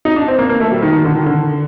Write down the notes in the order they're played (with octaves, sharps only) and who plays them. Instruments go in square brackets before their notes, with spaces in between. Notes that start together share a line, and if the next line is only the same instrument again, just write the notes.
[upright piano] D#4
D4
C4
A#3
A#3
A3
G3
D#3
D#3
D3
D#3
D3